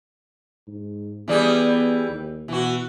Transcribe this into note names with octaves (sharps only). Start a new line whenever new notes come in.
G#2
E3 G3 B3 G#4
D#2
B2 E3 F#4